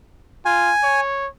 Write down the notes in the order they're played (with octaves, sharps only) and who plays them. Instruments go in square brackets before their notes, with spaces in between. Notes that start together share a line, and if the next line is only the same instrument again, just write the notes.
[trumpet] F4 [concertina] G#5
[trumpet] C#5